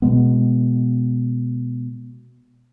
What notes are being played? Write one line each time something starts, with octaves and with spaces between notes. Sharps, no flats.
B2 G#3 B3